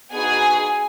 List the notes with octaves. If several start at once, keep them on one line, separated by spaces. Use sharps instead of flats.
B3 D#4 F#4 G#4 G#5